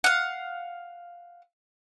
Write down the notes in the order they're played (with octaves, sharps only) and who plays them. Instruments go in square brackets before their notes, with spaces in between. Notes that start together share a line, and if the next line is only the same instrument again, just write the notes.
[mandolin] F5 F#5